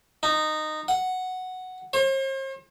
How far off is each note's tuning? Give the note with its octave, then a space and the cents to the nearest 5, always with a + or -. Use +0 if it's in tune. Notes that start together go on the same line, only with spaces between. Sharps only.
D#4 -15
F#5 +0
C5 +45